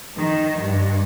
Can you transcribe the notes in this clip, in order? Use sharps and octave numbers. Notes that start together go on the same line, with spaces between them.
D#3
G2